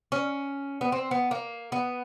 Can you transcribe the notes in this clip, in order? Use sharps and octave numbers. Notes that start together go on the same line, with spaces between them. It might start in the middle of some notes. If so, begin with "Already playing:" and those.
C#4
B3
C4
B3
A#3
B3